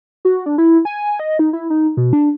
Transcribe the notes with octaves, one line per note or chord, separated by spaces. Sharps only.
F#4
D4
E4
G#5
D#5
D#4
E4
D#4
B2
D4